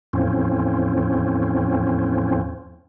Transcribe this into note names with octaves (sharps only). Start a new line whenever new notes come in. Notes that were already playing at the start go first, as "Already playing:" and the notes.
E2 A2 F3 C4 C#4